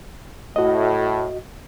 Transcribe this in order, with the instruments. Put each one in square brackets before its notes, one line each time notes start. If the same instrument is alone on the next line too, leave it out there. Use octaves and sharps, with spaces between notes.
[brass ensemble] A2 [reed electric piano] F#4 D#5